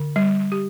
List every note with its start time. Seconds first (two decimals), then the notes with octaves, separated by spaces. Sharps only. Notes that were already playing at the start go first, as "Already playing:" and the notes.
Already playing: D3
0.16 G3
0.52 G4